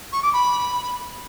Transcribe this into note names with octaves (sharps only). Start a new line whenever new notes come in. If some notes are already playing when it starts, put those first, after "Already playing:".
C#6
D6
B5